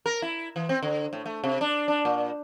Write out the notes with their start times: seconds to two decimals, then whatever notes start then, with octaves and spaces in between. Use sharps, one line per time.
0.06 A#4
0.22 E4
0.56 E3
0.69 C4
0.83 D3
1.13 A2
1.26 A3
1.44 C3
1.61 D4
1.88 D4
2.05 A#2